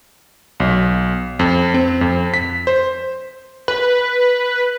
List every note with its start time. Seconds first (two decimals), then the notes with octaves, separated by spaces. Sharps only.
0.60 B1
1.39 F2
1.74 C4
2.01 F2
2.34 B6
2.67 C5
3.68 B4